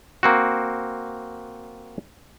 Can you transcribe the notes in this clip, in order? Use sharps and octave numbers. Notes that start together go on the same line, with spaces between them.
A#3 C4 F#4